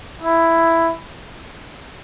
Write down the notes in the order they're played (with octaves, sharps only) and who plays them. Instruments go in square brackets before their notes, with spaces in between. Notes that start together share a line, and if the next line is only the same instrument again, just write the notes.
[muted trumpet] E4